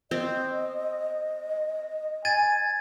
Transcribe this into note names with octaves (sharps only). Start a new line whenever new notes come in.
C4 D#5
G#5 G#6 A6 D#7